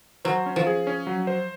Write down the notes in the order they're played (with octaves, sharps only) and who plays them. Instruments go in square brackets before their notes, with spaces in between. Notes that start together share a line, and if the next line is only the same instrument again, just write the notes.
[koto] F#3 [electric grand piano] C5
[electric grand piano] C#4
[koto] F3
[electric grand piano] G#4
C#4
F#3
C5